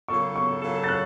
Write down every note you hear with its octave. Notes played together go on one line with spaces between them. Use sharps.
C#3 F#3 A#3 F4 A4 C#6
C#6
C#3 F#3 A#3 F4 A4
A6
F#6